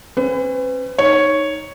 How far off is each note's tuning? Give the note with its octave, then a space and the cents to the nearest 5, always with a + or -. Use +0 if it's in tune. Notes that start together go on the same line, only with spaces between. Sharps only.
C#4 -45 B4 +35
D#4 +0 C#5 +0